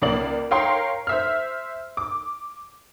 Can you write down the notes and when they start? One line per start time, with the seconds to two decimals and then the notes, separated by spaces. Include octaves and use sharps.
0.02 C#2 A#3 D5 F#7
0.51 A#4 C#5 F5 G5 C6
1.07 C5 E5 F6
1.97 D6